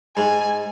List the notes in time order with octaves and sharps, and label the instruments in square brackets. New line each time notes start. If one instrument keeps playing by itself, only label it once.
[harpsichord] G#2 [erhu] G#5